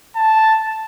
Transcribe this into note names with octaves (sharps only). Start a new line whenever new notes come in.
A5